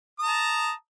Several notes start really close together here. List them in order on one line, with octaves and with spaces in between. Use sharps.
D#6 A#5 A5